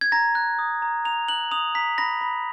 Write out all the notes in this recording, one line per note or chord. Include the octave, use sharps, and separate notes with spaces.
G#6
A#5 A#6
F#6
D#6
A#5
A#5 F7
F#6 F#7
D#6 F7
A#5 B6
B5 A#6
B5